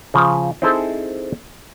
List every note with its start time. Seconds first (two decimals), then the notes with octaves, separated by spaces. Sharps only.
0.14 C#3 F3
0.62 C4 D#4 E4 G#4 A4 C5